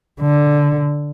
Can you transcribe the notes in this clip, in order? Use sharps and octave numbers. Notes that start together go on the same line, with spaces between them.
D3